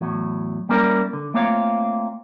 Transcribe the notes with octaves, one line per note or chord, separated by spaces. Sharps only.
E2 A2 F#3
G3 A#3 C#4 E4 A#4 D5
D3
A3 A#3 C4 F4 C#5 F5